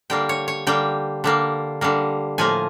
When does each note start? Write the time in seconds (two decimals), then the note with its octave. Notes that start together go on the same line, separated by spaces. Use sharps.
0.10 D3 G3 A#3 G5
0.29 C#5
0.48 C#5
0.67 D3 G3 A#3 G5
1.24 D3 G3 A#3
1.81 D3 G3 A#3
2.38 A2 F3 A#3 G#5